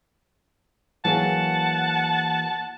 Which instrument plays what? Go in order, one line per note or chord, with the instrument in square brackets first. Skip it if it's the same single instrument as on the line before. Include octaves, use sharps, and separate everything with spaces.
[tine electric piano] E3 A#3 [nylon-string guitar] F#3 G#4 G#5 [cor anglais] F#5 [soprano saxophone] A5